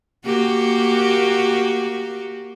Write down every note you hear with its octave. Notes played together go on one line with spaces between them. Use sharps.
A#3 F#4 G4